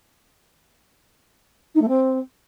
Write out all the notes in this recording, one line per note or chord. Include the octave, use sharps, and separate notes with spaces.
D#4
A3
C4